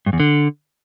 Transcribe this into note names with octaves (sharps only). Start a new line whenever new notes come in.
G2
E2
D3